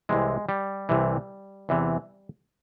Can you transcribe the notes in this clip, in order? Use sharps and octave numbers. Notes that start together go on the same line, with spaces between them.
C2 C3 E3 G#3
G3
C2 C3 E3
E2 C3 E3